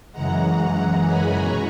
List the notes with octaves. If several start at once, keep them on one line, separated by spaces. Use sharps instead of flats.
F#2 C#3 E3 G#3 F#5 A#5
G#5 B5
B2 A#5 C#6